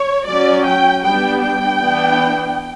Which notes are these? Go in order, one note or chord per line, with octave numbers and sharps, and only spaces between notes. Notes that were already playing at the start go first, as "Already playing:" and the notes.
Already playing: C#5
F#3 C#4 D5
G5
G3 B3 D4 G5
G5
E3 B3 D4